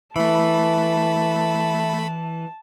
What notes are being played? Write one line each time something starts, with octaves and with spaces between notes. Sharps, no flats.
E3 A3 E5 A5 B5